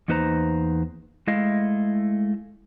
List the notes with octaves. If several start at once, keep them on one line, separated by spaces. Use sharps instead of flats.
E2 A#3 D#4 B4 C5 A#5
G#3 A3 E4 D#5 F5